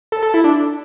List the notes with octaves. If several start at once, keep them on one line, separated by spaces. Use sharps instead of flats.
A4
A4
E4
D4